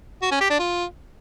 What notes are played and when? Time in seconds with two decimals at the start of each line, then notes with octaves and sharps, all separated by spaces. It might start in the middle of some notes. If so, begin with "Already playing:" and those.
0.22 F#4
0.31 C#4
0.41 G4
0.50 D4
0.60 F4